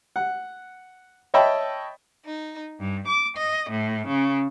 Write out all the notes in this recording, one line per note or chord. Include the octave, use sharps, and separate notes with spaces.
F#5
C#5 D#5 E5 G5 A5 B5
D#4
G2
D6
D#5
A2
C#3